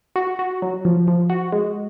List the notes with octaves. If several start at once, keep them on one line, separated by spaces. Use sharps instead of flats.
F#4
F#4
F#3
F3
F3
F#4
G#3